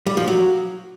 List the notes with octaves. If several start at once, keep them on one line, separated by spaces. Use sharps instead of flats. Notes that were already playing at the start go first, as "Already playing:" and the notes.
G3
F3
F#3